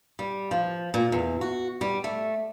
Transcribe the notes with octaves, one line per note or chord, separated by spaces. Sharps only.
G3
F3
A#2
E2
F#4
G3
A3